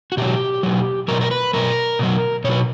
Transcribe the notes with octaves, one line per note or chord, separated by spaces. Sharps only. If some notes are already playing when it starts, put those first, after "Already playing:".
F#4
B2 F#3 G4
B2 F#3
B2 F#3 A#4
A#4
B4
B2 F#3 A#4
B2 F#3
B2 F#3 B4 C#5